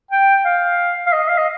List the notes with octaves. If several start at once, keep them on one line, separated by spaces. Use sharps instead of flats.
G5
F5
F5
D#5
F5
D#5